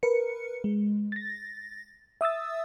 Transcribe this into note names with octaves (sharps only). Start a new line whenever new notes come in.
A#4 B4 C#7
G#3
A6 A#6
E5 D#6 E6 A6